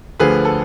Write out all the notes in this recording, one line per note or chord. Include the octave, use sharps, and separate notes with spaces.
D2 D3 F3 G#4 B4
A4